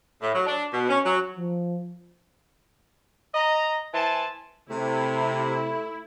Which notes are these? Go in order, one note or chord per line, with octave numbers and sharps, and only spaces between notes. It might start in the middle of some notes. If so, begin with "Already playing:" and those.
A2
F#3
D4
B2
C#4
F#3
F3
D#5 A#5
E3 C5 G#5 A5
C3 A3 E4